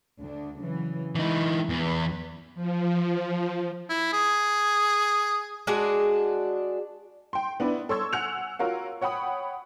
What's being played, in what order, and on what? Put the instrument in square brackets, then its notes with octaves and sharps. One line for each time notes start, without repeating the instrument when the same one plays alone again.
[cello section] D2 D4
C#3 E3 F#3
[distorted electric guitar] E3 D#4 [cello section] G#3 E4
[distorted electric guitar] E2 [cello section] B4
[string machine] F3
[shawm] E4
G#4
[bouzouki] G#3 D4 F#4 G#4
[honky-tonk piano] G5 C6
B3 D4 E4 B4
A4 C#5 C6 C#6 E6 G#6
F#5 G#5 E6 F#6 C#7 F7
F4 F#4 A#4 C#5 F5
C#5 F#5 G5 B5 D#6